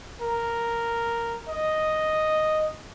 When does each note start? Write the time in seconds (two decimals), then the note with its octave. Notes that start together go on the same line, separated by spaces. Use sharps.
0.22 A#4
1.48 D#5